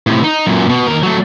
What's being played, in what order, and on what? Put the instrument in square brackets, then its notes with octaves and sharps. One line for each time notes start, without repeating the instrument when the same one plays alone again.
[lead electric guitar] A2 C3
D#4
F#2 A#2
B2
D#2 A#4
F#3 A3